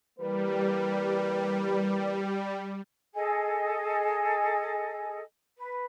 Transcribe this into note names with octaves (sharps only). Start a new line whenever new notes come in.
E3 G3 A#3 B4
G#4 A4 D#5 G#5
B4